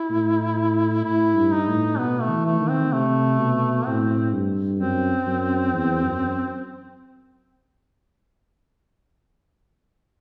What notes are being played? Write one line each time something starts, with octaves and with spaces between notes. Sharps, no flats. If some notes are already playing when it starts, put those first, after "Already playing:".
Already playing: E4
A2
A2 E4
G2
D#4
A2
B2 B3
A3
E3
A3
D#3
C4
C3 A3
B2
A2 C4
G2
F#2 C4
F#2
E2
F#2